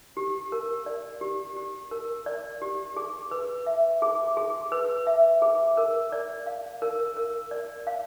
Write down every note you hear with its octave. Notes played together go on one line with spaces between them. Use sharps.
G4
A#4
D5
G4
G4
A#4
D5
G4
G#4
B4
E5
G#4
G#4
B4
E5
G#4
A#4
D5
F5
A#4
A#4
D5
F5